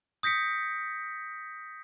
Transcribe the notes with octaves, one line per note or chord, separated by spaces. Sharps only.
D#6 G6 A#6 B6 C#7